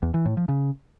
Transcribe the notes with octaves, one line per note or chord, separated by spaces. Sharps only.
E2
E3
A2
F3
C#3